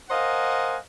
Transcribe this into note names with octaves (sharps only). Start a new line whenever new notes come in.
A#4 C5 D#5 F5 F#5 G#5